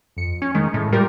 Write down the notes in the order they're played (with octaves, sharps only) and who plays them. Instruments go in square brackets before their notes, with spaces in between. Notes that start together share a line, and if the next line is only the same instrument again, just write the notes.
[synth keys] F2 C#7
[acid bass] C#4
[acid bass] D#3 [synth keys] G#3
[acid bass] A2
[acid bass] G3 [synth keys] F4 G4 A#4